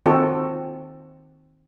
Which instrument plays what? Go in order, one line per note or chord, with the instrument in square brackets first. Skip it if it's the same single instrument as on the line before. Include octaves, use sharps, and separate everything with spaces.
[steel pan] D#3 C4 F4 F#4 A4